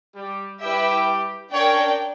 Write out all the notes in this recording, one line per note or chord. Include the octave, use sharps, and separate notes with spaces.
G3 G4
G3 E4 G4 B4 E5 G5
C#4 D4 A#4 C#5 D5 G5